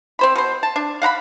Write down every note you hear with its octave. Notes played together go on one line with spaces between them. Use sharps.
C4 C5 B5
B2 C5
A5
D4
F5 F#5 A#5 B5